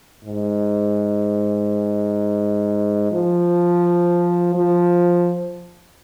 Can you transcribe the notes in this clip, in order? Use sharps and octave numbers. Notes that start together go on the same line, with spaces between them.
G#2
F3
F3